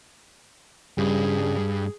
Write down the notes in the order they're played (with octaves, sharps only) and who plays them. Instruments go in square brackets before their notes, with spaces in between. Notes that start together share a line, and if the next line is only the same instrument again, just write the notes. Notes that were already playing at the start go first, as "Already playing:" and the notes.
[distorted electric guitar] G2 [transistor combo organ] C#3 G3 [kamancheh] G#4